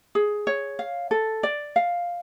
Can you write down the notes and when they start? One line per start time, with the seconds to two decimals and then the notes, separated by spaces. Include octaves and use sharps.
0.15 G#4
0.47 C#5
0.79 F5
1.11 A4
1.43 D5
1.76 F5